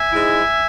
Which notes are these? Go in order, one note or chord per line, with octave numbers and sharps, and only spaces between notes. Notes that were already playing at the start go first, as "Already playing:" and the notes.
Already playing: E5 G#5
G#2 G#3 E4